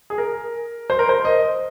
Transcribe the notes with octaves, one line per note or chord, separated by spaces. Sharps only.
G#4
A#4
C5
A#4
C5
D#5